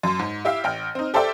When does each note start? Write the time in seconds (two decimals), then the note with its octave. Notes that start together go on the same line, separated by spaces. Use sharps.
0.03 F#2 C6
0.19 G#2
0.45 E4 G4 E5 F5
0.64 A1 G5 F6
0.95 C4 D#4
1.14 G4 A4 C5 D5 E5 G5